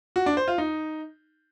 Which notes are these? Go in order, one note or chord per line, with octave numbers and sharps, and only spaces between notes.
F#4
D4
C5
F4
D#4